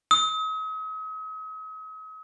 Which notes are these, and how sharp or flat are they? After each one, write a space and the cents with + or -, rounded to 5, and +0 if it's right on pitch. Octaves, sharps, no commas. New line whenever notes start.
D#6 +45